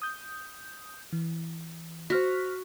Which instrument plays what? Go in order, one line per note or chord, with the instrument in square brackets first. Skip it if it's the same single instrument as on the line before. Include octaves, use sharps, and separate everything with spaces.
[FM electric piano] D#6 G6
E3
[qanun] F#4 [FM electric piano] C5 F6 B6